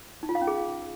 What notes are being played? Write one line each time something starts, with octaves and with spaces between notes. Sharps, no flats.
D#4
F4
F5
C#4
G#4